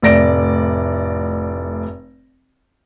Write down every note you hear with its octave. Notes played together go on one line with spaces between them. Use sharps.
F1 A2 D5 A#6 D7